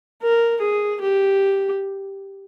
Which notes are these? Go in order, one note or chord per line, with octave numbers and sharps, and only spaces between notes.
A#4
G#4
G4